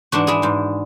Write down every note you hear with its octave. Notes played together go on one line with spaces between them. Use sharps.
G#2 E3 D4 F#4
E4 G#4
G#2 E3